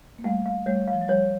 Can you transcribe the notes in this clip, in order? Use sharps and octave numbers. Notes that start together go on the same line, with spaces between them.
A#3
G3 A3 F5
F5
G3 A3 C#5
F5
F3
F#3
F3 G3 C#5